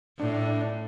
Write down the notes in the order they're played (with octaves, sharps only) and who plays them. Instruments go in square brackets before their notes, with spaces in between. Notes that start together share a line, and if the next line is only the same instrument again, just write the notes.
[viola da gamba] A2 [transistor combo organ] D4